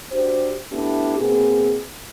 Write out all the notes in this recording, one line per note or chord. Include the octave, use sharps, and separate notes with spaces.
D4 F#4 G4 C5
A3 B3 D4 E4 G4
B2 A#3 C4 G#4